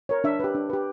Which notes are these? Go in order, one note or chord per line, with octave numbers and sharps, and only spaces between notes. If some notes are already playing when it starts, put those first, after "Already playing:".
A#4 C#5
D4 E5
G4 B4
D4
G4 B4